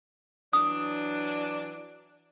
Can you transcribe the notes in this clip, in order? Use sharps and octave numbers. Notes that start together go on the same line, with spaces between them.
E3 F#3 D4 D#6